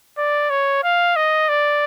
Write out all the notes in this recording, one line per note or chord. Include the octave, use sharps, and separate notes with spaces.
D5
C#5
F5
D#5
D5